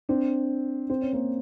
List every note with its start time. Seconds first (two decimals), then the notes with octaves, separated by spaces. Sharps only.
0.09 C4 D4
0.90 C4
1.01 C#4
1.13 A#3 C4